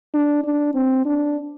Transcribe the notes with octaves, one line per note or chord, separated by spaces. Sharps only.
D4
D4
C4
D4